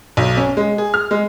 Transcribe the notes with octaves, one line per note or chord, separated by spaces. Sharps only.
B1
C#4
G#3
G#4
F6
G#3